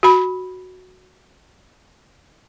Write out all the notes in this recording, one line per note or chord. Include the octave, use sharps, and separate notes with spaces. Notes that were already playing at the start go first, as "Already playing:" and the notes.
F#4 B5